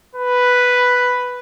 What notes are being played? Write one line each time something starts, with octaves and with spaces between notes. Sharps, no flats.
B4